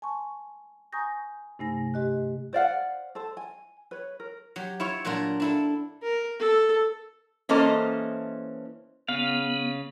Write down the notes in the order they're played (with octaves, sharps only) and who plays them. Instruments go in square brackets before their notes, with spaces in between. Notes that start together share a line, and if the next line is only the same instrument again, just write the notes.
[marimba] G#5 A5 C6 C#6
G#5 A#5 C#6 D#6 G6 A#6
G2 C3 A3 D#4 G#5 A#6
G#2 G4 D#5 F#6
[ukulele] C5 D5 F5 F#5
A4 C5 A5
G#5
B4 C#5
A#4
[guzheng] F#3 G4
E4 F4 C#5
A#2 F#3 D4 F4 A#4
D4 E4 A4
[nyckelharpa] A#4
A4
[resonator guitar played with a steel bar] E3 A#3 C#4 A4 C5 D#5
[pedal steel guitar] C#3 F5 [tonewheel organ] B3